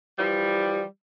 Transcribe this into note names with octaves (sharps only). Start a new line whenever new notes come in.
E3 F3 G3